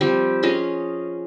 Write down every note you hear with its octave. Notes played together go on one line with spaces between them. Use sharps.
F3 G3 C4 G4
C#4 F4 G#4 D#5